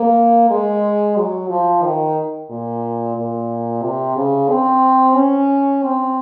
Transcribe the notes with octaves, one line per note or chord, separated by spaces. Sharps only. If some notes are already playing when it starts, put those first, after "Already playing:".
Already playing: A#3
G#3
F#3
F3
D#3
A#2
A#2
C3
C#3
C4
C#4
C4